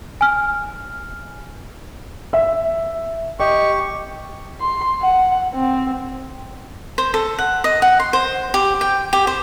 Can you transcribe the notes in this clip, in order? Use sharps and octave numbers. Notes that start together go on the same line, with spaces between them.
G#5 F6
E5
G4 D#5 C#6
C6
F#5
C4
C5
A4
F#5
D#5
F#5
C6
C5
G4
G5
G4
C5